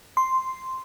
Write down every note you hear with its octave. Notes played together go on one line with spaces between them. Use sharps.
C6